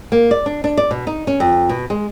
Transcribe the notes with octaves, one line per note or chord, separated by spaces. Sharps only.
A#3
D5
D4
D4
D5
B2
D#4
C#4
F2
B2
G#3